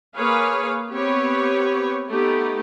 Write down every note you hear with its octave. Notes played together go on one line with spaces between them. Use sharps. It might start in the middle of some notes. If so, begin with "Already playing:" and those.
A#3 G#4 B4 C#5 F5
B3 C4 G4 B4 C#5
A3 B3 D#4 G4